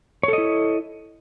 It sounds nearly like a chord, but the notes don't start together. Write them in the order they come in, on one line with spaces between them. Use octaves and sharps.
C#5 A4 D#5 E4